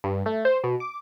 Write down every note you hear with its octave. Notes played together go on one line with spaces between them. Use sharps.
G2
A3
C5
B2
D6